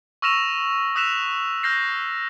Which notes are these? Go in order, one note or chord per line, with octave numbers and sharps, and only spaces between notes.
C#6 E6 F6 A#6 E7 F7
D#6 E6 F#6 B6 E7 F7
F6 G6 A#6 C7